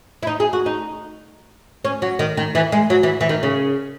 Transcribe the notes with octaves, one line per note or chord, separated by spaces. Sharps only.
E4
D#4
G#4
F#4
D#4
C#4
F#3
D#3
D#3
E3
G#3
F#3
E3
E3
D#3
C#3